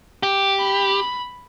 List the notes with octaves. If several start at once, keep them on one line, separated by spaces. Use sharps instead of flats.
G4
B5